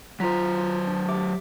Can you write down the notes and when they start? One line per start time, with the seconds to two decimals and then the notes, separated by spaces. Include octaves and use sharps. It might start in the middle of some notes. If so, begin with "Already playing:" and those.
0.20 F#3 F4 C5 A#5 B6
0.87 D4
1.08 G4 E5 D6